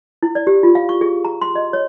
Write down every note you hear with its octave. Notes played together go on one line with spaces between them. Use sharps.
E4
D5
G4
F4
F5
C#6
G#4
A#5
C6
D#5
C#5